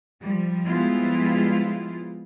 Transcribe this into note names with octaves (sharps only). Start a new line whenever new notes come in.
F3 G3
F3 G3 G#3 B3 E4 F4